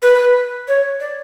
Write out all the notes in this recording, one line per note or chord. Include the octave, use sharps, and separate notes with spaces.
B4
C#5
D5